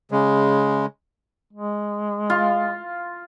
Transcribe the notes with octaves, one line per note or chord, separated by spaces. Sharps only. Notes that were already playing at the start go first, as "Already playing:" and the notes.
C#3 G#3
G#3
F4